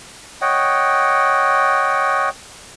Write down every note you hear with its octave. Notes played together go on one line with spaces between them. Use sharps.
C#5 D#5 F#5 G5